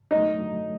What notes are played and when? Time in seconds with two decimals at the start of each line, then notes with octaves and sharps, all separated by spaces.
0.11 F#2 D3 F#3 A3 D#4
0.40 F#2 D3 F#3 A3